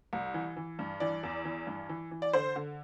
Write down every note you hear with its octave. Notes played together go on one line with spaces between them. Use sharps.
C2
E3
E3
G2
E3 D5
E2
E3
G2
E3
E3
D5
D3 C5
D3